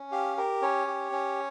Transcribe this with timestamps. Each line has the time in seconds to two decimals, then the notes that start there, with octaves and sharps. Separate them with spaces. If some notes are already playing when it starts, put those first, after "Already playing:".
Already playing: C#4
0.12 G4 F5
0.37 G4 A#4
0.62 C#4 C#5
0.87 G4
1.12 C#4